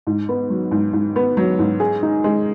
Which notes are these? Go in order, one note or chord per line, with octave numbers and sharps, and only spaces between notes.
G#2
B3
F#3
G#2
G#2
B3
F#3
G#2
G#4
D#4
G#3